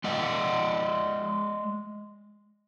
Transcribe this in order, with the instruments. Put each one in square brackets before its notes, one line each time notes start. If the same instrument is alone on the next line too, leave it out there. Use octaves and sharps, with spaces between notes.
[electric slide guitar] G#3 D5 D#5 F#5